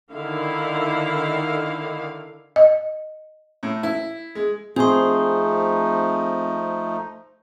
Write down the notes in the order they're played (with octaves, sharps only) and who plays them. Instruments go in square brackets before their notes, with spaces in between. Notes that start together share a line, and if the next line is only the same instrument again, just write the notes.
[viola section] D3 D#3 E4 F5
[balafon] D#5
[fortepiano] A2
E4
G#3
[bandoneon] F3 A3 D#4 [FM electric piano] C4 [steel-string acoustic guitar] G#4 [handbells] C5 C6